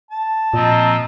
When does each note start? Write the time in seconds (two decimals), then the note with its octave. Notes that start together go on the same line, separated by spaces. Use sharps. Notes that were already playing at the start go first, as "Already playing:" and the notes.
0.11 A5
0.54 A#2 F3 C4 D#5 A#5